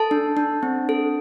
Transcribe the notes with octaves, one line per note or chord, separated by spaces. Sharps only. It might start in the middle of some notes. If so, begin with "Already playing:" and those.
Already playing: A4 A5
D4
D4
C4
A4